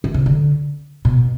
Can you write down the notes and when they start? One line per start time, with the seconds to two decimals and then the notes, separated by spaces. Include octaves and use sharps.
0.04 E3
0.14 C3
0.26 D3
1.05 B2